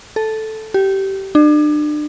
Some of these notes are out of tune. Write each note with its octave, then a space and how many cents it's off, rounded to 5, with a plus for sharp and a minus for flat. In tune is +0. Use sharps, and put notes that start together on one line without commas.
A4 -5
G4 -20
D4 +35